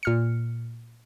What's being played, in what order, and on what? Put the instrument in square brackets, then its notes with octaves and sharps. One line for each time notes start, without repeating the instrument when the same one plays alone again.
[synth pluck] A#2 F6 C#7